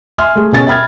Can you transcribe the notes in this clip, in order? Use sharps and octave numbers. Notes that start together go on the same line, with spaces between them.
E5 G#5 C6 F6
A3 G#4
B2 C#4 A6
E5 G5 B5 F6 G#6